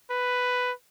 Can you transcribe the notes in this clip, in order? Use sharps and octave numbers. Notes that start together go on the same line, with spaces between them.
B4